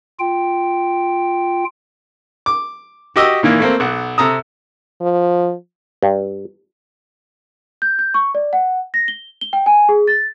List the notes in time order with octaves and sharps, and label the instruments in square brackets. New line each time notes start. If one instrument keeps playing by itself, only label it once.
[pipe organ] F4 G5
[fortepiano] D6
F#4 G4 D#5 E6
A#2 D#3 E3 A#3
A3 A#3 C4
B1 F#5
C3 A4 A#5 D#6
[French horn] F3
[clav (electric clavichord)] G2
[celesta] G6
G6
C#6
D5
F#5
A#6
G7
G7
G5
G#5
G#4
A6